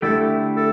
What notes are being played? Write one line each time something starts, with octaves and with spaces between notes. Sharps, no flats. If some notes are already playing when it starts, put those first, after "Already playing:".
D3 A3 E4 G4 A4
A4